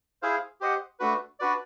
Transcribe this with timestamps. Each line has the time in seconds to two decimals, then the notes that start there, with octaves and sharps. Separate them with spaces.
0.22 E4 G#4 C5 F5
0.61 G4 C5 D#5 F#5
1.00 A3 D4 F#4 B4
1.40 D4 F#4 B4 D5